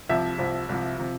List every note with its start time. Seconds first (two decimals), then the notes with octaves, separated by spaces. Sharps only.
0.09 C2 C3 F3 E5
0.38 C2 C3 F3
0.69 C2 C3 F3
0.98 C3 F3